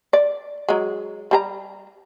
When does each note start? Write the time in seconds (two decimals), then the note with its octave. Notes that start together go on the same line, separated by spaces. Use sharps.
0.13 D5
0.69 F#3 G#3
1.31 G3 G#4 A#5